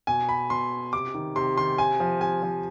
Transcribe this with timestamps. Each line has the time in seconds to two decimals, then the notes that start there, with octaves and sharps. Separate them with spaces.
0.07 B2 G#5
0.29 B5
0.50 B2 C6
0.93 C3 D6
1.14 D#3
1.36 C3 C6
1.57 D#3 C6
1.78 C3 G#5
2.00 F3
2.21 C3 G#5
2.43 F3